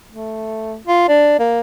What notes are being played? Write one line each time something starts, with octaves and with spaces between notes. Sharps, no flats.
A3
F4
D4
A#3